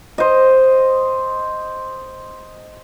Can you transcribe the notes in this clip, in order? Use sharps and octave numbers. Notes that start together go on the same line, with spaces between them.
C5 D#5